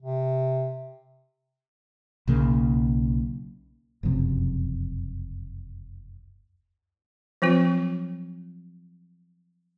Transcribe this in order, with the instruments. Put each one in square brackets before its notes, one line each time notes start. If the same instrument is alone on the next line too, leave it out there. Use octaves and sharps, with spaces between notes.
[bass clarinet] C3
[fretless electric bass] B1 C#3 A#3
F1 C#2 F#2 C3
[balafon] F3 F#3 C4 F4